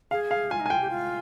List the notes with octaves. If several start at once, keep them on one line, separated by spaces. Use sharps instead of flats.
G#4 F5
F5
F4 G#5
D#4
G#5
F4 G5
G4
F4